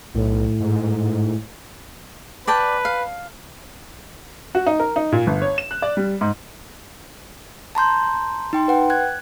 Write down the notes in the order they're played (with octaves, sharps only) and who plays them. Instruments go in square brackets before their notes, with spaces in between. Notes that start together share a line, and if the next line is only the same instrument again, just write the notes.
[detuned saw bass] B1 [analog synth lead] A2
[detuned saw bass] G#2
[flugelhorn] B4 [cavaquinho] D5 G5 A5
[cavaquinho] F5
[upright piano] F#4
D#4
A#4
D#4
A#2
G1
C#5
E7
F#6
D5
G3
G#2
[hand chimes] A5 A#5 C6 G6
D#4 G5 C6
B4 F#5 G5
F#6 G#6